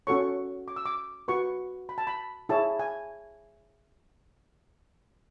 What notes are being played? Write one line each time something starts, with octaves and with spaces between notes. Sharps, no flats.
C#4 F#4 A4 C#5 C#6
D6
E6
D6
F#4 B4 C#6
B5
A5
B5
E4 G#4 C#5 A5
G#5